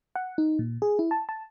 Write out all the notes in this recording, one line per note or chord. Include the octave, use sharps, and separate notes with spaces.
F#5
D#4
A#2
G#4
E4
A5
A5